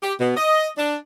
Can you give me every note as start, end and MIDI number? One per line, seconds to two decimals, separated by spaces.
0.02 0.13 67
0.20 0.33 47
0.36 0.68 75
0.78 0.96 62